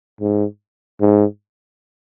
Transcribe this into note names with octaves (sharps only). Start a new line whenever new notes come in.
G#2
G#2